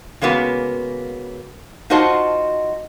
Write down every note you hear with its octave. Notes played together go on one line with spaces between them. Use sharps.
C#3 G#3 A#3 B3 F#4
D#4 F4 F#4 C5 D#5 A5